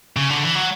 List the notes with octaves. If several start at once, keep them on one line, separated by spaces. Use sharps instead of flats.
C#3
D3
E3
F#3